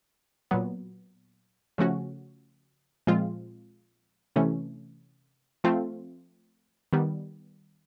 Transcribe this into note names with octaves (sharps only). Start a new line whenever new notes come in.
A#2 F#3 B3
C#3 F3 A3 C#4 F#4
A#2 F3 G#3 C4 F4
C3 E3 A3 C#4
F3 A3 C4 F4
D#3 G3 B3